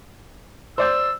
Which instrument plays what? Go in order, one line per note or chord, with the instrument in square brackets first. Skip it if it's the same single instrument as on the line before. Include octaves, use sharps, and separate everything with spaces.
[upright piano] C5 D5 G6 [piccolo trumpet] E6